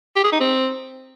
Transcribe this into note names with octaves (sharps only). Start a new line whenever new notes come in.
G4
G#4
D#4
C4